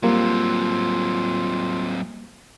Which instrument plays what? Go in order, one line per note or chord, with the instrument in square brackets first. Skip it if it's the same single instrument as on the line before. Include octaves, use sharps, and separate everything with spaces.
[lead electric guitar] F#3 C4 [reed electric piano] G3 A#3 [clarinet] F4